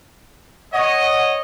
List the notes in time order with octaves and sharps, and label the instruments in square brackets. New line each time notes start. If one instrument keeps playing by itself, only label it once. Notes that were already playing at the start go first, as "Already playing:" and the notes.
[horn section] C#5 D#5 [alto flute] F#5